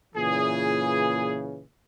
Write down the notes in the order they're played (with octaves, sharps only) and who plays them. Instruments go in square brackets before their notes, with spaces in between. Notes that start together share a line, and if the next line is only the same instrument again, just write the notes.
[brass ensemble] A#2 C#3 E3 [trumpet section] G#4